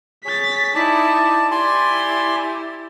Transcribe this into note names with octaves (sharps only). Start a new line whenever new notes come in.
G#4 C#5 A6 B6
D#4 E4 D5 A5
E4 G4 D5 G#5 C6